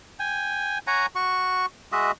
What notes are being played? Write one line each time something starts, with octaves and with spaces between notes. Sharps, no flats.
G5 G#5
C#5 F#5 G#5 A#5
F#4 C#6
G#3 F#4 D#5 E5